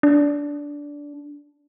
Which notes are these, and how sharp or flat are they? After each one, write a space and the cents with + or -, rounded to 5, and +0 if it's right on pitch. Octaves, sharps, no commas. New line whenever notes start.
D4 -15